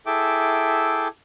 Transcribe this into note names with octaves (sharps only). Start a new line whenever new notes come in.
E4 G#4 A4 E5 G5 D6